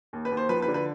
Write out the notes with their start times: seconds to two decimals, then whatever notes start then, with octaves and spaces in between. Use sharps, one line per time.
0.13 D#2
0.25 B4
0.31 D#2
0.37 C5
0.49 F3 B4
0.62 B4
0.68 D3
0.74 B4